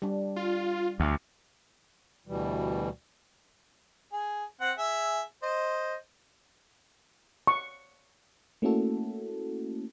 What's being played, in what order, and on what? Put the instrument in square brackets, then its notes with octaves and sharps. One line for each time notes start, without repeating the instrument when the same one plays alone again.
[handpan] G3 D4
[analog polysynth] F4
[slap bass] D2
[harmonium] D2 B2 E3 G3
[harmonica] G#4
C4 F#5
G#4 E5
C5 D#5
[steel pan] C#6
[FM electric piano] A3 A#3 C#4 E4 F#4 A4